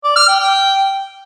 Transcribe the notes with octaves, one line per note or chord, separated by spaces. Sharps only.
D5
F6
G5
G5